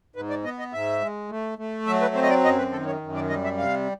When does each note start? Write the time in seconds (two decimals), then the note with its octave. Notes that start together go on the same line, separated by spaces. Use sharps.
0.16 G#2 B4
0.30 D5
0.44 B3 D#5
0.59 D#5
0.73 G#2 E5
1.01 G#3
1.30 A3
1.58 A3
1.87 F#3 E5
2.02 B4
2.15 C4 C5
2.23 D#5
2.29 D5
2.45 F#2 D#5
2.58 B4
2.72 D#3 A4
2.86 C#5
3.01 F#2
3.15 D5
3.30 G3 D#5
3.44 E5
3.58 C3 F5